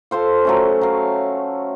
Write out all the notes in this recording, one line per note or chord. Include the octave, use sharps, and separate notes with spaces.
F4 A4 C5 F5
F#3 A3 C#4
F#3 F5